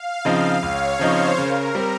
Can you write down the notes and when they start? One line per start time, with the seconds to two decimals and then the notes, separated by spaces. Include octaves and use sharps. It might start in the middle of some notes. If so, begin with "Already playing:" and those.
Already playing: F5
0.25 C#3 F3 C4 D#4
0.62 C#2 C#5
0.99 C#3 F3 C4 D#4 C5
1.38 C#3 A#4
1.75 G3 C4